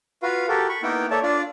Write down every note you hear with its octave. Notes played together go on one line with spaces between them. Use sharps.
F4 F#4 B4 F5
F#4 G4 A4 A#4
B5 C#6
A#3 B3 D#4 E4 A#4 G5
A#3 A4 C#5 D5 E5 A5
D4 F4 D5